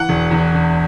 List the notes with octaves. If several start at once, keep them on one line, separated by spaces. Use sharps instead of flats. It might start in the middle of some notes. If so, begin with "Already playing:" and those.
Already playing: E3 F#5
E1
E2
E1